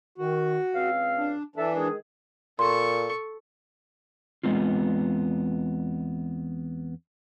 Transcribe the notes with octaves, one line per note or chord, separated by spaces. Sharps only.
D#3 F#4
C#2 C4 F5
D4
E3 D4 A4 E5
D#3 G#3 G#4
A#2 A4 C6 C#6
E2 G#3 B3 C4 F4